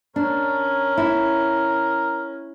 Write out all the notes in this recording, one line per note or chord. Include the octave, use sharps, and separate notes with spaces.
C#4 D4 A#4
E4